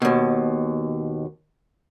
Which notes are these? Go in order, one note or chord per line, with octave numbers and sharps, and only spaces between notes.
D#2 B2